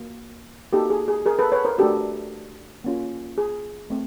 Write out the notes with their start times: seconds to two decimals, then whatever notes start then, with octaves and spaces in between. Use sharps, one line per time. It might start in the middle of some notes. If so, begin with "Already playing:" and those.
Already playing: A#3 F#4
0.73 A#3 D#4 F#4 G4 A4
0.90 G#4
1.08 G#4
1.26 G#4 A#4
1.39 A4 B4
1.52 B4 C#5
1.65 A#4 C5
1.78 A3 D4 F#4 G4 A4
2.84 A#3 C#4 F4
3.38 G#4
3.90 A3 C4